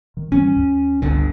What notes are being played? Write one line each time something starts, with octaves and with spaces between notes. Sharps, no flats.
D#3
G#2 E3 G3 C#4
D#2
G1 C#2 D3